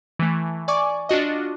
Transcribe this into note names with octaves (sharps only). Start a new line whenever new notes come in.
E3 A3
D5 G#5 C#6 D6
D4 F4 F#4 D#5